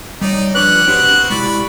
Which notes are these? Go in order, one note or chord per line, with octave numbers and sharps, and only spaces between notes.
G3 D#4 C#5 D5
F3 G3 D4 B4 C#5 D6 F#6
B3 C4 D4 F#4 G4 B4
C3
G#3 E4 G4 D5 B5 C#6